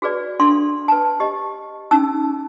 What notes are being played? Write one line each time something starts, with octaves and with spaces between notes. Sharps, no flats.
F#4 G#4 B4 D5
D4 A4 F5 C6
B4 A5
G4 D#5
C#4 D#4 A5 E6